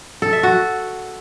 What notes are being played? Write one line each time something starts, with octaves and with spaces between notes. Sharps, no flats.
A4
E5
F#4